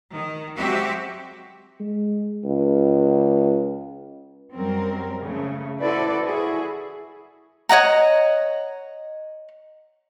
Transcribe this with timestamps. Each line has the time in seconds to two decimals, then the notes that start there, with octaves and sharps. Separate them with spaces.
0.12 D#3
0.56 F#3 G#3 C4 F#4 G4 E5
1.80 G#3
2.45 C#2
4.55 F#2 F#3 G3 C4 A#4
5.22 C#3 A3
5.80 E4 F#4 A4 B4 C5 D5
6.25 E4 F#4 G#4
7.69 C#5 D#5 F#5 A#5